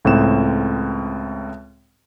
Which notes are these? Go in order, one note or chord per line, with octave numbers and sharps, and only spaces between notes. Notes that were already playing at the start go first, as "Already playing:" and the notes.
C#2 A2 C4 E7